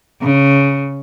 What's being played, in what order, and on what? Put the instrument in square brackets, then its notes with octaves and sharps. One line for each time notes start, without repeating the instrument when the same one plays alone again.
[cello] C#3